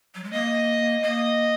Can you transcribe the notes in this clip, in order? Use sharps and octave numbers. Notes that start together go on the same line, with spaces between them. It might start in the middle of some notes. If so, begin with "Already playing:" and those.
F#3
G#3
A#3 D#5
A#3 D#5